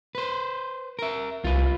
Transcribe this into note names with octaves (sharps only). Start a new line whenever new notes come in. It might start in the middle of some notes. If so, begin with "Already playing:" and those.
B4 C5
A#4 E5
C2 F4 B4